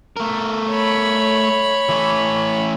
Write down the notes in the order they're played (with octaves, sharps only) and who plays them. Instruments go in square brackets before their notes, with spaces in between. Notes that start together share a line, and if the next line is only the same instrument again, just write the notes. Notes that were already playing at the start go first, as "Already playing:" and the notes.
[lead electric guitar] A3 A#4
[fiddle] C#5 B5
[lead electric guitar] E3 A3